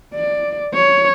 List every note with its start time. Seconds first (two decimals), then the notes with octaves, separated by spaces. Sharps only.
0.14 D5
0.74 C#5